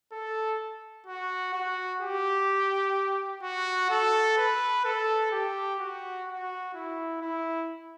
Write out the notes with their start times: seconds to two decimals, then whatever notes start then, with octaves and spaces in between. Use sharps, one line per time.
0.12 A4
1.07 F#4
1.53 F#4
2.01 G4
3.43 F#4
3.90 A4
4.37 B4
4.85 A4
5.32 G4
5.80 F#4
6.27 F#4
6.74 E4
7.21 E4